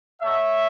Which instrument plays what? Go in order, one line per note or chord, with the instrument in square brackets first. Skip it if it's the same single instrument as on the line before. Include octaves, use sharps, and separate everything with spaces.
[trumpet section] A3 D#4 F#4 C#5 E5